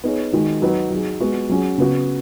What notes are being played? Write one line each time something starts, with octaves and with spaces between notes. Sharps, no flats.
B3 D#4 G#4 C#5
D#3 G#3 D#4 F#4
F#3 D#4 B4
F#3 D#4 G#4
G#3 B3 F#4
F#3 C#4 G#4
C#3 B3 F#4